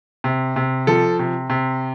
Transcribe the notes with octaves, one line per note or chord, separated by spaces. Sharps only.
C3
C3
F3 A4
C3
C3